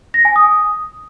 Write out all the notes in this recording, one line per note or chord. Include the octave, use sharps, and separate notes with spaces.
A#6
G#5
D#6